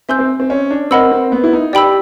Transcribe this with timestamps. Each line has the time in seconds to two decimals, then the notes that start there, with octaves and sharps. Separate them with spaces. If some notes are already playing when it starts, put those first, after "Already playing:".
0.09 C4 E5 G#5 C6 E6 G6
0.19 C4
0.40 C4
0.50 C#4
0.71 D4
0.91 C4 A#4 D#5 F#5 B5 E6
1.12 C4
1.32 B3
1.44 E4
1.53 D#4
1.73 G4 D5 G5 B5 E6